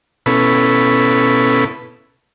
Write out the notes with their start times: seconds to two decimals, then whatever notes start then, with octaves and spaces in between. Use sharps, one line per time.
0.26 B2 C#4 E4 A4 B4